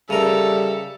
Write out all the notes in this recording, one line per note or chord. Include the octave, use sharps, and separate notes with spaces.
C#3 G3 A4 A#4 E5